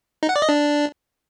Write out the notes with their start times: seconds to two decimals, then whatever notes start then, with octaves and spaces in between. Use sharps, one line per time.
0.23 D#4
0.29 F#5
0.36 D5
0.42 D#5
0.49 D4